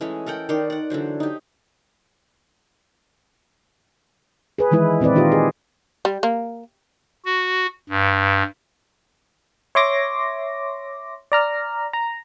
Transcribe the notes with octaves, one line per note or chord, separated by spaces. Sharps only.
E3 G#3 A3 C#4
A4 A#4 F#5 G5
D#3 C#5 D5 C6
D5 F#5
D3 E3 F#3 C5
D#4 G4
G#4 B4
D#3 E3 G#3 E4 B4
A#2 C4 E4 B4 D5
D#3 D#4 F4 G4 D#5
G#4
G3
A#3
F#4
G2
C#5 E5 C6 D6 A#6
D5 A#5 F6
A#5